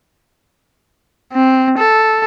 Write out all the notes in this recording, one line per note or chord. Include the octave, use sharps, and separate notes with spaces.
C4
A4